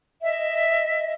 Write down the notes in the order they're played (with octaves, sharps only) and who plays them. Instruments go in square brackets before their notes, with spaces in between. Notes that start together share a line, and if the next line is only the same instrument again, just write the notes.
[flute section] D#5 E5